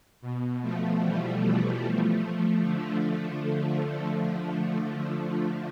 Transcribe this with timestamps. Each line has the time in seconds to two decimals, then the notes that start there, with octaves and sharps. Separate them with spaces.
0.21 B2
0.61 F3 A3
1.01 E3 G3
1.42 E3 G3
1.82 F3 A3
2.61 D3 F3